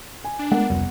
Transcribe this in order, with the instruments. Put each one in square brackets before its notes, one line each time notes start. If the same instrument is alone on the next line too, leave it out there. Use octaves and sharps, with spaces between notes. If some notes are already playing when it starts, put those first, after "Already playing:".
[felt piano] G#5
[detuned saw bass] D4
[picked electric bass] G#3 [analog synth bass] A3 [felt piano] B3 A#4 F#5
[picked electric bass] F1 [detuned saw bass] C#2 [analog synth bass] G3